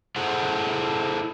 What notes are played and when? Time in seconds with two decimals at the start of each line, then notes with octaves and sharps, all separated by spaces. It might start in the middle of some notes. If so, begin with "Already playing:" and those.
0.16 E4 G#4 A4 C5 F#5